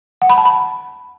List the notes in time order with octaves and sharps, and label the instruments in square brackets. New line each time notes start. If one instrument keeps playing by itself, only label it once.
[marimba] F#5
B5
A5
B5